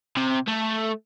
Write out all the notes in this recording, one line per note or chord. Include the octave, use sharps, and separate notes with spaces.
C3
A3